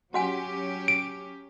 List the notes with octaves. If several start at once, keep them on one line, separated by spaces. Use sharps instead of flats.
F#3 C#4 F#4 G4 F#5 G#5
D7